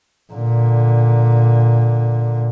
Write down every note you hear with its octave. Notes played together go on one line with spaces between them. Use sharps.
A#2 D3